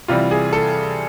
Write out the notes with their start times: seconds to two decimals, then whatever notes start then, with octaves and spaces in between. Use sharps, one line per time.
0.08 C3 E3 G3 F4
0.31 G#4
0.53 A4